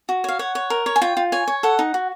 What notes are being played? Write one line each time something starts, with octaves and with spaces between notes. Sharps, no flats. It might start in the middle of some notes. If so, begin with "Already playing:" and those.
F#4
C#5 F5
C#5 F#5
C#5
A#4
C#5
G#5
F4 G5
F4
C#5 G#5
C#5
A4 F#5
D#4
F#4